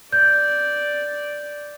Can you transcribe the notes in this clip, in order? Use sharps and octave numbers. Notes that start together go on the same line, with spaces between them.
D5 G6